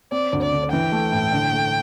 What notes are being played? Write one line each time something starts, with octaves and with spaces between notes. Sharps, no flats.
C4 D5
D2
D5
D3
E3 G5
A3
A2
D3
A3